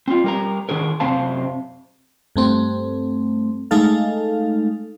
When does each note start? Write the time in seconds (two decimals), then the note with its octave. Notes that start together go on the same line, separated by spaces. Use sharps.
0.08 C4 F4
0.24 G3 A#4 A#5
0.69 D#3 D4 G#4 A#4
1.00 F#2 C3 C4 C5 F5 A5
2.36 G2 A3 C4
3.71 G#3 A3 D#4 A4 F5